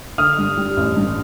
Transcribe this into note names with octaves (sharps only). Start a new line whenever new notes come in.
D3 D#6 F6
G2
G3
A1
G2